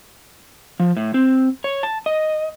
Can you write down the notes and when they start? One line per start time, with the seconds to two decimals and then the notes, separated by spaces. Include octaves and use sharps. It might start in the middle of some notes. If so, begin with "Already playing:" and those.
0.80 F3
0.97 A2
1.14 C4
1.64 C#5
1.83 A5
2.06 D#5